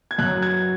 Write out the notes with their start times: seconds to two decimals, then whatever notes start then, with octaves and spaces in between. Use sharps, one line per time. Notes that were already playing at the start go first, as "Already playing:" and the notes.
0.11 G#6
0.18 F#2 F#3 F#6
0.42 G#6